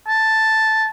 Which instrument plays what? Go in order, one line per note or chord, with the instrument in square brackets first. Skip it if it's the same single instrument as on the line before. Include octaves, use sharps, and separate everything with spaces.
[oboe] A5